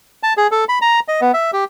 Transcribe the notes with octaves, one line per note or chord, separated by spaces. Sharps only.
A5
G#4
A4
B5
A#5
D#5
B3
E5
G4